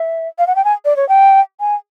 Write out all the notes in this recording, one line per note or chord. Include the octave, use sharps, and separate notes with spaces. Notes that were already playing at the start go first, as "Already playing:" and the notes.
Already playing: E5
F5
F#5
G5
G#5
D5
C#5
G5
G#5